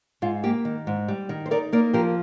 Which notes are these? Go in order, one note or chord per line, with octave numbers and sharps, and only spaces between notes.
G#2 F4
A#3 G4
D#3
G#2
G3
D#3
C5
D#4 A#4 D5
A#3 A#4 D5
F3 G4 A#4